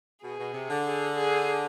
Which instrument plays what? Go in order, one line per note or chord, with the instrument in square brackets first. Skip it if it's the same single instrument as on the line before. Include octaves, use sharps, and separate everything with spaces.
[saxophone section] B2 [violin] G#4
[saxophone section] B2
C3
D3
[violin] G#4
G#4